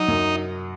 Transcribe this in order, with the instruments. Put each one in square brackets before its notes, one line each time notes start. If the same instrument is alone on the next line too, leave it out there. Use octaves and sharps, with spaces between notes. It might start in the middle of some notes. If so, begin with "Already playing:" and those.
Already playing: [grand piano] F#3 F#4 [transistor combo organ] D#4
[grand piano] F#2